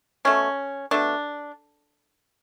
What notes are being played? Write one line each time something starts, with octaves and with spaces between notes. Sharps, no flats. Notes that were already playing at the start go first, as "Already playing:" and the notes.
B2 A3 C#4
B2 A3 D4